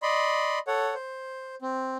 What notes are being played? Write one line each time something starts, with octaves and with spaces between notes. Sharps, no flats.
D5 D#5 B5 C6
A4 C#5 F#5
C5
C4